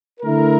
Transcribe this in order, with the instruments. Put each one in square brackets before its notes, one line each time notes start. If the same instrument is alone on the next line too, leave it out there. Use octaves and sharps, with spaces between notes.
[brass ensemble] D3 A3 E4 A#4